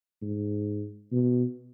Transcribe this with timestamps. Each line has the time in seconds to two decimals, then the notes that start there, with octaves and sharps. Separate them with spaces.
0.22 G#2
1.12 B2